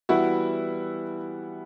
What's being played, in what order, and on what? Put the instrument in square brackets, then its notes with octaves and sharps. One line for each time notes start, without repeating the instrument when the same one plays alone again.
[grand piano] E3 G3 B3 [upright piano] E4 F#4